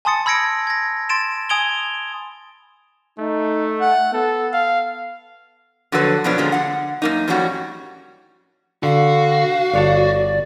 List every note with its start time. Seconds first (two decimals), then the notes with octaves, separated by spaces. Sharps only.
0.05 G#5 A5 C6 D#6 A6 C#7
0.26 B5 E6 G#6 A#6 C#7 D7
0.67 G#6 A#6
1.09 C6 A6 D7 E7
1.49 G#5 D#6 G#6 D7 F7 G7
3.19 A3 D#4
3.81 F#5
4.13 B3 A4
4.53 F5
5.92 D3 F3 F#3 F#4 A4 B4
6.24 B2 F3 F#3 B3 D4
6.38 A#2 D3 F3 F#3 G#3
6.52 D3 F#5
7.02 F#2 A#3 D#4
7.28 F2 A2 G3 C#4 F4 F#4
8.83 D3 F#4 F5
9.74 G1 C#5 D5 A5